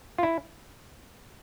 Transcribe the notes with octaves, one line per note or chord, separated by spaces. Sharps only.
F4
E4